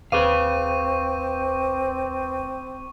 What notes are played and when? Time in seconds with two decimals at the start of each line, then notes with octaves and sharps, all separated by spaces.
0.12 D#2 C4 G#4 B4 F5 C#6 D6 D#7